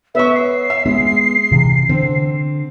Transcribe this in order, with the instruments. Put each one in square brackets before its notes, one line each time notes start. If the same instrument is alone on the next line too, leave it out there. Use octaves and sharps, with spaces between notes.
[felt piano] B3 C#5 C#6 [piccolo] E5
[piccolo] C7
[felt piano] E5
[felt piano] G#3 [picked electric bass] B3
[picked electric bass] C3 E3
[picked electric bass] D3 [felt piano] C4